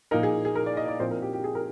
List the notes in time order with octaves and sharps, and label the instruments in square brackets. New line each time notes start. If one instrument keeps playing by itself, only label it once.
[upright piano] A#2 F3 A#3 D#4 A#4
G#4
G#4
A#4
D5
D#5
D5
A#2 F3 C4 D#4 C5
A#4
G4
G4
G#4
A#4